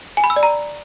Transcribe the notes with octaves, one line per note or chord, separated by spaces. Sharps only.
G#5
B5
E6
D5
A#5